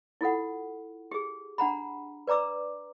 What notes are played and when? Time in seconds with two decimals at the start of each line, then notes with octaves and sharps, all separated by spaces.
0.21 E4 F4 A4 F#5
1.11 G4 G#4
1.58 D4 F#5 A#5 B5
2.27 B4 D5 A#5 D6 E6